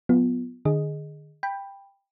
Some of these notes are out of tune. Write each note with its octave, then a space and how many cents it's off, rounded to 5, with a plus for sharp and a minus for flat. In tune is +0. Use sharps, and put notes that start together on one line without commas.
F#3 -45 B3 +0 F4 +0
D3 +45 G#4 +0 D#5 +0
G5 +15 B5 +0